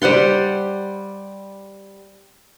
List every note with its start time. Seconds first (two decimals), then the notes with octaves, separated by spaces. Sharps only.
0.02 G3 C5 F#5 C6